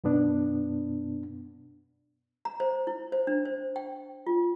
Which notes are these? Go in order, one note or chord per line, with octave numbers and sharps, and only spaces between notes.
F#2 B2 B3 D4
A#5
C5
E4
C5
D4
C5
G5
F4